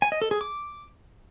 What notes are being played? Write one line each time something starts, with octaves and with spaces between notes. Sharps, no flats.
G#5
D#5
A4
G#4
D6